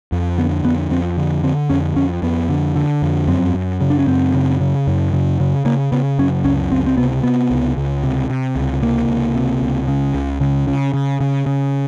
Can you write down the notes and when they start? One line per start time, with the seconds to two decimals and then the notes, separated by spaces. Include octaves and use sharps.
0.12 F2
0.38 D3 B3
0.64 F2 B3
0.91 F2 C4
1.17 D3
1.43 D3 C4
1.69 F2 C#4
1.96 F2 C#4
2.22 F2 B3
2.49 D3
2.76 D3
3.02 F2
3.28 F#2 C4
3.54 F#2
3.81 C#3
3.90 D4
3.99 C#4
4.07 F#2 C4
4.34 C#3
4.61 C#3
4.87 F#2
5.13 C#3
5.40 C#3
5.65 C#3 A#3
5.92 C#3 B3
6.19 F#2 C#4
6.44 C#2 C#4
6.72 C#2 C4
6.86 C4
6.97 C3 B3
7.23 C3 B3
7.50 C#2
7.77 C#2
8.03 C3
8.30 C3
8.56 C#2
8.82 C3 A#3
9.09 C#2
9.35 C3
9.62 C#2
9.88 C#3
10.14 C#2
10.41 C#3
10.67 C#3
10.94 C#3
11.21 C#3
11.46 C#3